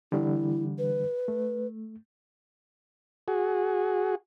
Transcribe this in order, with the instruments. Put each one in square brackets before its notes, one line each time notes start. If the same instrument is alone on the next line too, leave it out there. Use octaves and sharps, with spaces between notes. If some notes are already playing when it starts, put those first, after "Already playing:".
[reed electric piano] D3 E3 G3 [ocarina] E4
[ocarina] B4
[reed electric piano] A3
[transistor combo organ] F#4 G#4